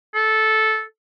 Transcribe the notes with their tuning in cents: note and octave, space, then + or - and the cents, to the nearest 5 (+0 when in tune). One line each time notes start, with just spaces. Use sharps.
A4 -10